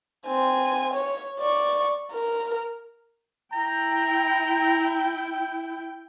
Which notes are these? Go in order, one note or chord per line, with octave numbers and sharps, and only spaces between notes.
C4 G#5
C#5
D5 C#6
A#4
E4 G5 A#5